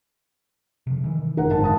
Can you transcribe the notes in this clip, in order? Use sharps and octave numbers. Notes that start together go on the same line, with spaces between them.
C3 F3
D#3 E3
F#1 A#4 F#5
G#1 G#2 A5
F5 A5 D#6